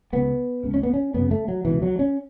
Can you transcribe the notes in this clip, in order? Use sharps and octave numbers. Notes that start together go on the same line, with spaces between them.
C#2 C#3 B3
C#2 C#3
C#4
B3
C#4
F#2 C#3 B3
A3
F#3
C#2 B2 E3
F#3
C#4